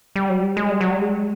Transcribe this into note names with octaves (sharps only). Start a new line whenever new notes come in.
G3
F#3
G3
G#3
G3
F#3
G3
G#3